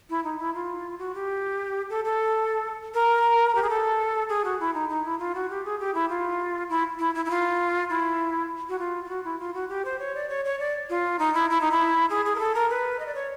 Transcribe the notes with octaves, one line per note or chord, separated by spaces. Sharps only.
E4
D#4
E4
F4
F#4
G4
A4
A4
A#4
G4
G#4
A4
G#4
F#4
E4
D#4
D#4
E4
F4
F#4
G4
G#4
G4
E4
F4
E4
E4
E4
E4
F4
E4
F#4
F4
F4
F#4
E4
F4
F#4
G4
C5
C#5
D5
C#5
C#5
D5
F4
D#4
E4
E4
D#4
E4
G#4
G#4
A#4
A4
A#4
B4
D#5
D5
C#5